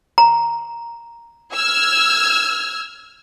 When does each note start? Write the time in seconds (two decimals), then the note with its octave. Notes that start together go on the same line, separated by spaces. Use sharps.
0.18 A#5
1.53 E6 F6 G#6